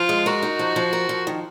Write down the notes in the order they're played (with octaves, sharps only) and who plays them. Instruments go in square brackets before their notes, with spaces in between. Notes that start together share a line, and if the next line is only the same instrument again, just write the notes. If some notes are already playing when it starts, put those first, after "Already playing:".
Already playing: [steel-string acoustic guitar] F3 [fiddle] F4
[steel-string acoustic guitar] G#3
[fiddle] F#4 [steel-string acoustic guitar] A#4
[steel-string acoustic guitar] D#4
F3
F3
A#4
F3
D#3